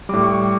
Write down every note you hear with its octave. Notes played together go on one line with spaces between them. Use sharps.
A2 G3 D6
C#6